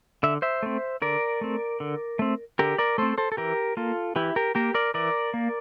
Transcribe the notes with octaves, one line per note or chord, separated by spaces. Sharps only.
D3 E5
C5 E5
A3 C4
D3 A#4 D5
A3 C4
D3
A3 C4
D3 G4 A#4
A#4 D5
A3 C4 A4 C5
A4 C5
A4
E3 G4 A#4
A#3 F4 A4
E3 E4 G4
G4 A#4
A#3 G4 A#4
A#4 D5
E3 A#4 D5
A#3